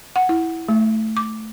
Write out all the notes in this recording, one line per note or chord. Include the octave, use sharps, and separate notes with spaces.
F#5
E4
A3
D6